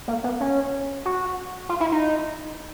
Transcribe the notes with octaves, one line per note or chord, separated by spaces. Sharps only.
A#3
B3
C#4
F#4
F4
E4
D#4